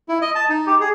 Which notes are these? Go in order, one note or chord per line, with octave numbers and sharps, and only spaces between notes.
E4
D#5
A5
D#4
G4
G#4